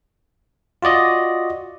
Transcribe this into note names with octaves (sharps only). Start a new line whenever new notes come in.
F4 F#4 D5 D#5